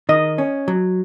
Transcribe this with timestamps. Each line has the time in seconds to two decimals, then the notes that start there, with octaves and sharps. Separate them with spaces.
0.09 D#3 D#5
0.38 C#4
0.68 F#3